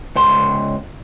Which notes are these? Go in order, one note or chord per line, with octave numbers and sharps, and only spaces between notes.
C#2 C5 C6